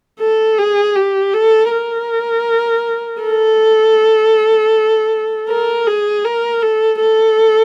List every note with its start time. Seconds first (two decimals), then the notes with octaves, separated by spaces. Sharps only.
0.20 A4
0.58 G#4
0.96 G4
1.33 A4
1.71 A#4
3.22 A4
5.49 A#4
5.87 G#4
6.25 A#4
6.63 A4
7.00 A4